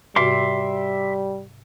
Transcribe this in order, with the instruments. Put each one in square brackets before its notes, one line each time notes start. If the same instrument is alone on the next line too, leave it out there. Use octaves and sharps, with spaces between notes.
[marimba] G#2 C3 F#4 [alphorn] G3 [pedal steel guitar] E5 C6 D6